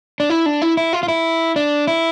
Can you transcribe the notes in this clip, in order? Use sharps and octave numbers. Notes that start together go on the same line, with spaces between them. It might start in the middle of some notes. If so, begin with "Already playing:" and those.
D4
E4
D4
E4
E4
F4
F4
E4
D4
E4